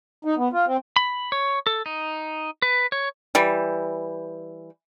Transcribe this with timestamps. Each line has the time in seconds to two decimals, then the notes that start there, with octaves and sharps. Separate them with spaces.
0.25 D#4
0.37 B3
0.53 F4
0.66 C4
0.96 B5
1.32 C#5
1.67 A4
1.86 D#4
2.62 B4
2.92 C#5
3.35 E3 G3